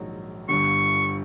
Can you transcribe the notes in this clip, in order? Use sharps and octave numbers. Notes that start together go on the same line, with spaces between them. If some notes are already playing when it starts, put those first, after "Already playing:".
Already playing: A#1 G#2 D#3 F#3
G1 G2 D3 C#6